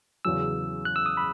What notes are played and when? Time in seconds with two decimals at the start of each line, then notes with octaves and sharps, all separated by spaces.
0.25 E2 C#3 F#3 C#4 E6
0.85 F#6
0.96 E6
1.06 D#6
1.17 B5